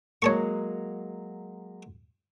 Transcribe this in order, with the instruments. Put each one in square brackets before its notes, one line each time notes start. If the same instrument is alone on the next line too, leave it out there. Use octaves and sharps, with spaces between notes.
[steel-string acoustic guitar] F#3 G#3 A#3 [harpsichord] C#5 A5 C#6